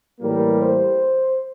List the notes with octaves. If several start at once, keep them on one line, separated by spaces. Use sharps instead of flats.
A2 E3 G3 A#3 A#4
C5